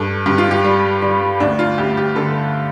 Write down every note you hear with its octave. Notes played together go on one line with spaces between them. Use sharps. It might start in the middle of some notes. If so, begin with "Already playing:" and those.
Already playing: G2 A4
G2 G4
F4
G4
G3
G3
D2 D4
F4
D2 G4
G4
D3 A4